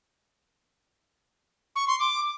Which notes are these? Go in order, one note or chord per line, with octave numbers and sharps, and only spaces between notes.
C#6
C6
D6